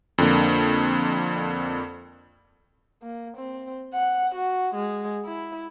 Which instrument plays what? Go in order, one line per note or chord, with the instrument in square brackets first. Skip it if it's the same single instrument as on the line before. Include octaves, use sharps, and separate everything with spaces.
[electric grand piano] F2 D3 A#3
[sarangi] A#3
C4
F#5
F#4
G#3
E4